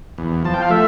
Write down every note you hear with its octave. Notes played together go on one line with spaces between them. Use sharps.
E2
F3 A5
G5
F5
A3 E5